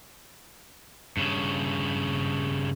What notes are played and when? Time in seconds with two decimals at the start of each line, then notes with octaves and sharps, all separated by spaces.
1.17 G2 C#3